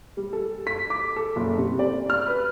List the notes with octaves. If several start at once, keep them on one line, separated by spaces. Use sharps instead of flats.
G3
A4
B6
D6
A4
F#1
C3
D5
F6
B4